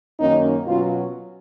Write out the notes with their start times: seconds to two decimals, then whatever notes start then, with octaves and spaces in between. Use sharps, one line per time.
0.20 F#2 D#3 A#3 C#4 D#4
0.67 B2 F#3 C#4 F4